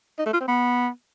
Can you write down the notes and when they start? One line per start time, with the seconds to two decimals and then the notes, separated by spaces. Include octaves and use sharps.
0.19 D#4
0.26 A3
0.33 F4
0.41 C4
0.48 B3